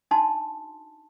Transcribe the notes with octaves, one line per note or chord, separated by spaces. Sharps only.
D4 D#4 F#4 A5 C6